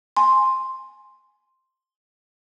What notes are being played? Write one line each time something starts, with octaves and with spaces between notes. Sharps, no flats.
G#5 C6